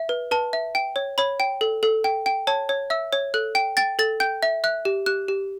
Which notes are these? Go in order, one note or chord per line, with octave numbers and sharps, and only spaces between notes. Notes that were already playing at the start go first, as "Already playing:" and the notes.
Already playing: E5
B4
B4 A5
E5
G5
C#5
C#5 B5
G5
A4
A4
G5
G5
C#5 A5
C#5
E5 E6
C#5
A4 F#6
G5
G5 A6
A4 A6
G5 G6
E5
E5 F#6
G4
G4 F#6
G4